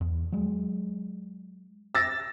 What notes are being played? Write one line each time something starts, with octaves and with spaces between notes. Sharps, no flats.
E2
F#3 G#3
E6 A6 A#6